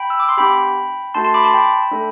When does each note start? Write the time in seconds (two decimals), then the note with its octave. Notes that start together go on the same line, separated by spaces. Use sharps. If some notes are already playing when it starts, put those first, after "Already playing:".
Already playing: G5 B5
0.10 E6
0.20 D6
0.29 C6
0.37 B3 D4 G4 G5 B5
1.14 A3 D4 F#4 A4 A5 C6
1.24 A5 C6
1.34 B5 D6
1.44 A5 C6
1.54 G5 B5
1.91 A3 D4 A4